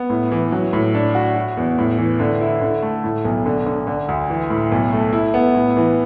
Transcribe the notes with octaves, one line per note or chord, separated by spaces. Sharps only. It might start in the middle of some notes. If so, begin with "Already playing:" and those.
Already playing: B3
A2
E3
F#3
A2
D4
F#4
F#4
E2
A2
E3
D3
E4
D3
A3
A2
B1
D3
D3
D3
D2
E3
A2
B1
A3
E4
B3
A2
E3